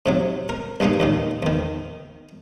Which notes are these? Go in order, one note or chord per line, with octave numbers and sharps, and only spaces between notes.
G#2 C3 F#3
A#4
C2 G2 G#3 A#3 D#4
D#2 A#2 D#3
E2 D#3